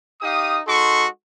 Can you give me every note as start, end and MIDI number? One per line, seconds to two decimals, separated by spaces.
0.22 0.60 63
0.22 0.60 67
0.22 0.60 77
0.22 0.60 87
0.68 1.07 56
0.68 1.07 63
0.68 1.07 66
0.68 1.07 69
0.68 1.07 84
0.68 1.07 85